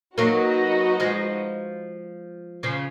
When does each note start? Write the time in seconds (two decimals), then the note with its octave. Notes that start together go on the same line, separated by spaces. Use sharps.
0.18 F#3 A#3 D#4 F#4 B4 D#5
1.00 F3 G#3
2.63 C#3 F3